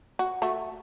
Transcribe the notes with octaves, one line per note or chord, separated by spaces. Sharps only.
F#4
A3 F#4